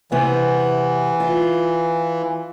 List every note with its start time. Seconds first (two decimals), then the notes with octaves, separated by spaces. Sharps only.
0.12 C3 E3 B3
1.20 F4